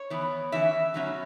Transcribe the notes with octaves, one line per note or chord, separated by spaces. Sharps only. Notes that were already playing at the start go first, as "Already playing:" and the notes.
Already playing: C#5
E3 B3
E3 C#4 E5
B2 F#3 C#4